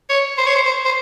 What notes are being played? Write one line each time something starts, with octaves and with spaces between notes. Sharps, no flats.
C#5
C5
C#5
C5
C5
C5